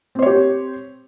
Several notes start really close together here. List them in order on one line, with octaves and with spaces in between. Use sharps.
C4 C5 C#5 G4